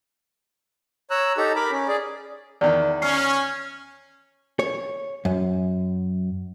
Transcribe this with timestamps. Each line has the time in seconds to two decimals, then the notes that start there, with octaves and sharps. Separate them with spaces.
1.10 C#5 A#5 E6 F#6
1.37 D#4 G4 A4 A#5
1.56 A#4 B5 D6
1.71 C#4
1.88 G#4 D5
2.61 E2 D#3 D5
3.02 C#4 F6 C7
4.59 C#5
5.25 F#2